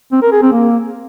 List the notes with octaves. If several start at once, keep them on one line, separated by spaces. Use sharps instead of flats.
C4
A#4
G#4
C4
A#3